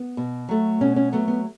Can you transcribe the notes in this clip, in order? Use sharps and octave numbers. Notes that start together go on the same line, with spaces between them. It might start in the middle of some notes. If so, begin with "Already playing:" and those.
Already playing: B3
B2
F#3 A3
B2 C#4
C#4
F#3 A3 B3
B3